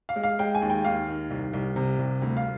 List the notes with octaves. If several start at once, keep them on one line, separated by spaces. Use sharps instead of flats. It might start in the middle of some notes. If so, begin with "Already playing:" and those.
F5
G#3
F5
G#3 G5
G#5
D#2
G5
D#2 F5
D#3
C2
C2
C3
C2
D2
F5